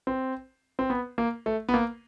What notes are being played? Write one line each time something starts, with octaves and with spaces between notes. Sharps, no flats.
C4
C4
B3
A#3
A3
B3
A#3